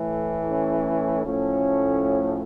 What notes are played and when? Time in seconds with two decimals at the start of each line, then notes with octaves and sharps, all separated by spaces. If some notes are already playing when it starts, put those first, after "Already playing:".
Already playing: A2 E3 A3
0.50 C#4
1.25 A2 F3 A3 C#4